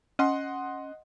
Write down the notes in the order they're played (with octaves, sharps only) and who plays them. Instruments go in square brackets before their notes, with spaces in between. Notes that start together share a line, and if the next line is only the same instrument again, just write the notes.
[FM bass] C#4 [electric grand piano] D#5 F#5 C6